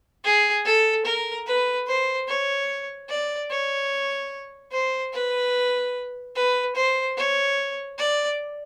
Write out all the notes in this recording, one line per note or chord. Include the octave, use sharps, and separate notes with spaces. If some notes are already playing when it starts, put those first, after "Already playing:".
G#4
A4
A#4
B4
C5
C#5
D5
C#5
C5
B4
B4
C5
C#5
D5